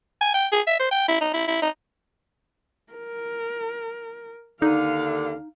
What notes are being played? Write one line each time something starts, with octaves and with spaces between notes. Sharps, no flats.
G#5
G5
G#4
E5
C5
G5
E4
D#4
E4
E4
D#4
A#4
D#2 D3 D#4 F5